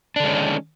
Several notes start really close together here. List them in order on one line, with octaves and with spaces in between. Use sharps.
D4 D3 G#3 C#4 D#3